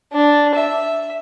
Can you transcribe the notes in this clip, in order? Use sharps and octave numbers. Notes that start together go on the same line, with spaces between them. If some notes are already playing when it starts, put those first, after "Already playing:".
D4
E5